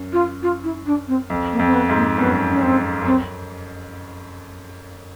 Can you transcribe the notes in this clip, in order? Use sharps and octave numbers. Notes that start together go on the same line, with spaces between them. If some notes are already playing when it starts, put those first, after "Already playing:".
Already playing: F#2
F4
F4
E4
D4
C4
F2
A#3
F2
C4
B3
G#2
A#3
F#2 B3
C#4
C4
F#2
C4